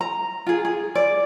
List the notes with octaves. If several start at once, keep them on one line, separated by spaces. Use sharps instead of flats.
A#5
F4 G#4
G#4
D5